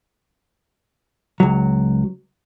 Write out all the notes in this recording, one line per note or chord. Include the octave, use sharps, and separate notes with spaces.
C#2 F#3